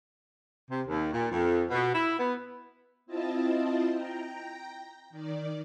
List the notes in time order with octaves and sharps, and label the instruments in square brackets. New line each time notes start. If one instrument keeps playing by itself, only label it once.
[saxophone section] C3
D#2
A#2
F2
B2
E4
B3
[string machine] C4 E4 F4 D#5 A5
G5 A#5
D#3 D5